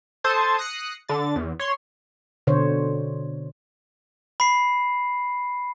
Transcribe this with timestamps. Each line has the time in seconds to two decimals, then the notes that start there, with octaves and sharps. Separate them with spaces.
0.24 A4 C5 A5 D#6 G#6
0.58 D#6 F#6 A#6 C7 C#7
1.09 D3 A6
1.36 E2
1.59 C#5 C6
2.47 B2 D3 C5 C#5
4.40 B5 C7